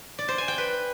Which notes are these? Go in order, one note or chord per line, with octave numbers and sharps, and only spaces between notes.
D5
C5
G#5
G5
B4